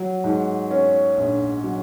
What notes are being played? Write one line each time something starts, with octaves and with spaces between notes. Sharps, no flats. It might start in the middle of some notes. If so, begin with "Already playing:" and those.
Already playing: F#3
G#2
C#4
A#1
F#3